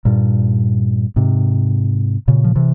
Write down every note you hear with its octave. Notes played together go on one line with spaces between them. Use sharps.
G2 A#2
G#2 C3
A#2 C#3
F3
C3 E3